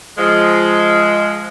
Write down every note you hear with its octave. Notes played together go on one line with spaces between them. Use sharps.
F3 G#3